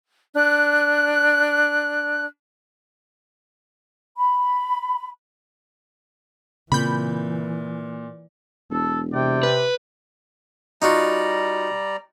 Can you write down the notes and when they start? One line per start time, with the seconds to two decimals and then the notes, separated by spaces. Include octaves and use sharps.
0.35 D4 F#6
4.17 B5
6.72 A#2 C#3 E3 C4 B5 G6
8.70 E1 A4
9.12 C3 D5 G5
9.43 B4
10.82 G3 D#4 F4 F#4 D5 A#5